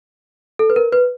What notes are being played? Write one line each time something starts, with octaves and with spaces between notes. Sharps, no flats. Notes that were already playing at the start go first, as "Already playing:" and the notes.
A4
B4
A#4
B4